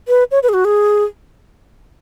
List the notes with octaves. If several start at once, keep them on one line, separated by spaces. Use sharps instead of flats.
B4
C#5
B4
G#4
F#4
G#4